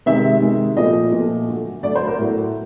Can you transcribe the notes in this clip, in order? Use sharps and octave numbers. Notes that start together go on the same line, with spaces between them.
C3 D#3 G#3 E5
C3 D#3 G#3
A#2 F3 A3 D#5
A#2 F3 A3
D3 F#3 A3
D3 F#3 A3 D5
C5
A#4
A2 F#3 A3